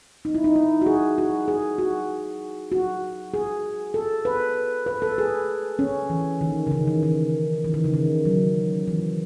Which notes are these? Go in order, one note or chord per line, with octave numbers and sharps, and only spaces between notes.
D#4
E4
D#4
E4
F#4
G#4
F#4
G#4
F#4
F#4
G#4
A4
B4
B4
A4
G#4
C#4
E3
D#3
C#3
D#3
E3
D#3
E3
D#3
C#3
D#3
F#3
E3